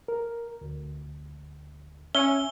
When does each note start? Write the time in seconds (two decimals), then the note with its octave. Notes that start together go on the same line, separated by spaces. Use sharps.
0.08 A#4
0.61 D2
2.15 C#4 E5 E6 G7